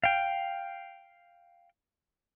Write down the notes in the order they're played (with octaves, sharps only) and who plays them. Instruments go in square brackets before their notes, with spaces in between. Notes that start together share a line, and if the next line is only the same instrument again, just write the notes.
[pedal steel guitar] F5 G5